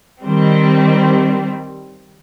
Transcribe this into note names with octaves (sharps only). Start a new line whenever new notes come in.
D#3 G3 C4